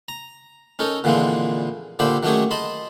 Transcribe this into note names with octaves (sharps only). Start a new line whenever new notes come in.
A#5
C#4 D#4 A4 A#4
A#2 D3 E3 F3 G#3 C4
A#2 D3 G4 C5 E5 B5
D#3 F#3 A3 C#4 G4 G#4
D#5 A5 B5 C6